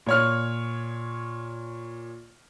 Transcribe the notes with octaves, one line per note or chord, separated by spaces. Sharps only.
A#2 C#5 F6